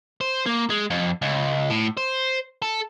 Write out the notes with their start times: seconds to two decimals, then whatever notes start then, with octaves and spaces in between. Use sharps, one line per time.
0.21 C5
0.46 A#3
0.70 G#3
0.90 F2
1.22 C#2
1.70 A2
1.97 C5
2.62 A4